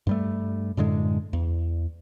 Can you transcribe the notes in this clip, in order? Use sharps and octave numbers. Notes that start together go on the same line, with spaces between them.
G2 G3 A3
F#2 A2 D3 G#3
E2